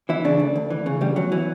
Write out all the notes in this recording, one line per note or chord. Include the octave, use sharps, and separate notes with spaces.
E3 E4
C#3 D4
D2
D2
E3
C#3
D2 G3
E2 F#3
E3